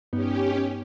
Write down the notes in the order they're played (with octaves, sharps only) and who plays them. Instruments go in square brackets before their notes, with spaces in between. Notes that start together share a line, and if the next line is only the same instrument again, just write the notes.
[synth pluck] G2 B3 D#4 [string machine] C#4 G4